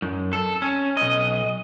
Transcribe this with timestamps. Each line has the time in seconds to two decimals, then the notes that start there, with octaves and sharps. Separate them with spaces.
0.02 F#2
0.33 A4
0.62 C#4
0.97 B1 D#5